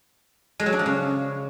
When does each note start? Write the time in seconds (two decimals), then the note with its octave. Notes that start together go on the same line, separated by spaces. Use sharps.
0.60 G#3
0.66 F#3
0.73 D4
0.79 F3
0.86 C#3